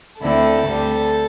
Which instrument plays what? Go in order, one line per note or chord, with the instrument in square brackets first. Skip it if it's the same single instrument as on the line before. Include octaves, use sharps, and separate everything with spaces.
[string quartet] D2 D3 C4 E4 [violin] A4
[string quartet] D2 D3 G3 C4